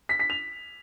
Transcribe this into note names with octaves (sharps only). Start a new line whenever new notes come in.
B6
B6
F7